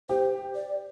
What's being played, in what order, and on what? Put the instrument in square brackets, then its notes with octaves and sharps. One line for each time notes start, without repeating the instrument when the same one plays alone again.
[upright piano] G4 [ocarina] C5
[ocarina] D5